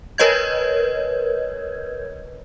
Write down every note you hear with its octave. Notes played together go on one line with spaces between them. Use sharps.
A#4 B4 C#5 D#5 G6 G#6